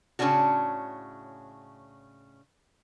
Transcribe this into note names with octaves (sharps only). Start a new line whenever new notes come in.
A2 C#3 F#3 C#4 D4 F#4